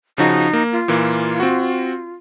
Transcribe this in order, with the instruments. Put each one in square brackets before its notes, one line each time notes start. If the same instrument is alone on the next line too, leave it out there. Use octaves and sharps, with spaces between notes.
[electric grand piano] C#3 F3 F#4 [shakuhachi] D#4
[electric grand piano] A#3
[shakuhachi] F4
[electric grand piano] A#2 E3 A#3
C4 F#4